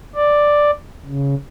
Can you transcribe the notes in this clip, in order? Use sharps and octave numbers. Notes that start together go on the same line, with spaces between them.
D5
C#3